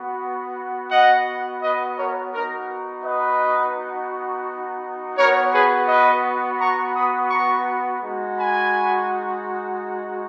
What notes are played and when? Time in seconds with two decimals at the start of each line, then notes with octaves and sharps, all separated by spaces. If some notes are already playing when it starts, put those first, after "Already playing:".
Already playing: B3 F#4
0.91 D#5 F#5
1.62 B4 D#5
1.98 A#4 C#5
2.33 B3 D#4 F#4 A#4
3.04 B4 D#5
5.18 B3 F#4 A#4 C#5
5.53 G#4 B4
5.88 B4 D#5
6.59 A#5 C#6
6.95 B5 D#6
7.31 A#5 C#6
8.02 G#3 D#4 F#4
8.37 G#5 B5